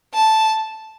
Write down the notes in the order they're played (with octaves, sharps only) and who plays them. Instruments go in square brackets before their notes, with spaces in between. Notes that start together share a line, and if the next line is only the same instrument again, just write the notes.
[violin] A5